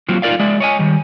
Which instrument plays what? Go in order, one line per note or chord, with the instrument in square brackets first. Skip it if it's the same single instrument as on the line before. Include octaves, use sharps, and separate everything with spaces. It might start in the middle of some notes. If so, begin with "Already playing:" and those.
[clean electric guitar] F#3 A#3 C4 F4 F#4
D#4 F4 A#4 D5 F5
G#3 D5 E5
C#5 D#5 G#5
D#3 G3